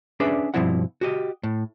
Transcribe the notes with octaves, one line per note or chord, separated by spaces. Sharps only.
C#4 D4 G#4 B4 D5 E5
G2 B2 F3 C4 E4 F#5
F#4 G4 D#5
A2